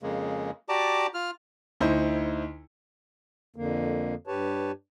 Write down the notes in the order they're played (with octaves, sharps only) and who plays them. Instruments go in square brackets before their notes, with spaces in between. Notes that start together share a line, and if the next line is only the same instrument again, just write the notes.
[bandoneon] F2 C#3 G#3 A#3
F#4 G4 D5 A5 A#5 D6
F4 F6
[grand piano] D2 D#4 E4 C5
[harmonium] F2 D3 A#3
G2 G4 B4 C#5 A5